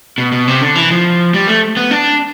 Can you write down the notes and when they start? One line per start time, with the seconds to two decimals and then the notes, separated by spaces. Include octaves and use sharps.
0.18 B2
0.32 B2
0.48 C3
0.61 D3
0.75 E3
0.91 F3
1.34 G3
1.48 A3
1.77 B3
1.91 D4